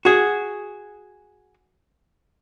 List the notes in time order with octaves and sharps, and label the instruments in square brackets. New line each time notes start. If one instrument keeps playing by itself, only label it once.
[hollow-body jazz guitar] F#4 G#4